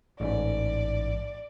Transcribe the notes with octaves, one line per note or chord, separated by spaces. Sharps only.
A1 G#2 D5